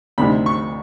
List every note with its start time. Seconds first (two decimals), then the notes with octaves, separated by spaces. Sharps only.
0.18 D2 C3 D#3 B5
0.46 C#6